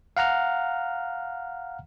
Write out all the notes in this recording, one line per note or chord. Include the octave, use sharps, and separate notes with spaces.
F5 F#5 A#5 F6